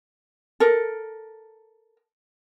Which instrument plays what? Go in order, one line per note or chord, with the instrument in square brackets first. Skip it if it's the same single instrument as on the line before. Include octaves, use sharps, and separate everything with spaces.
[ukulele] A4 A#4